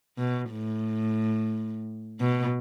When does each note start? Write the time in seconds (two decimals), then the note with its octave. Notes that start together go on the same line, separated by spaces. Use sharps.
0.18 B2
0.51 A2
2.20 B2